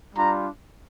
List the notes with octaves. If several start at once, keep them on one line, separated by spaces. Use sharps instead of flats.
G3 D4 F4 A#5